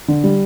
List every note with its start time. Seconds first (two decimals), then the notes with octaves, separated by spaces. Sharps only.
0.08 D3
0.24 G3